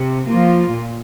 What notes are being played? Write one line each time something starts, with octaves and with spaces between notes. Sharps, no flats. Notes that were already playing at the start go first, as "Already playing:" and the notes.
Already playing: C3
F3 A#3 F4
A#2